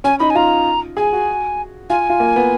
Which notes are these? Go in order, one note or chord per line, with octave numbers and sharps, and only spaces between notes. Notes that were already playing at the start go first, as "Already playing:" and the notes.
C#4 G#5
D#4 B5
G#5
F4 A#5
G#4 G#5
F#4
F4 G#5
F4
A#3
B3